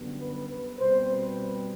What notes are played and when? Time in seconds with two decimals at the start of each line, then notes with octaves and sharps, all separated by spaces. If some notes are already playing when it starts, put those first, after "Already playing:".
Already playing: F#2 D3 G3 B3
0.18 B4
0.48 B4
0.78 B2 G3 C4 C5
1.09 B4